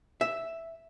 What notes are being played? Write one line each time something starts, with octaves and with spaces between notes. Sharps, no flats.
E5